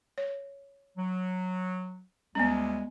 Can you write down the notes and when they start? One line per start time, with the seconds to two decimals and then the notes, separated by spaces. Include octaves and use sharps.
0.18 C#5
0.97 F#3
2.35 D2 G3 G#3 B3 C#4